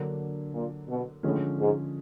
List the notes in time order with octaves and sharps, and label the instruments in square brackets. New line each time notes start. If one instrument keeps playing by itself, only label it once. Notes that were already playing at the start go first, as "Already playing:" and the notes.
Already playing: [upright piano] D3 F#3 A#3 D4
[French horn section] A#2
B2
[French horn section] A2 [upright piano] D3 F3 G#3 C#4
[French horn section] G#2